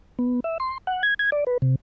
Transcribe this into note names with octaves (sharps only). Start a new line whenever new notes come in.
B3
E5
C6
F#5
G#6
G#6
D5
B4
C3